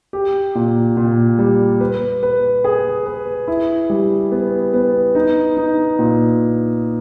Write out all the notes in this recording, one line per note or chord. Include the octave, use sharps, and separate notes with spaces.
G4
A#2
A#2
G3
B4
B4
G#4
B4
E4
G3
B3
B3
D#4
D#4
A#2